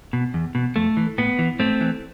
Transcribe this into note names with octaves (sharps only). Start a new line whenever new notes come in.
B2
E2
B2
F2 A3
E3
A2 B3
E3
A2 A3 C4
E3